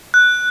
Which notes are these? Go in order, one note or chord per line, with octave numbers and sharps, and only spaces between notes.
F#6